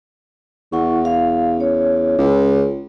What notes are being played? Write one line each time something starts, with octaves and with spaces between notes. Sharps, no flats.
E2 E4 F#5 C#6
F5
C#4 C#5
C#2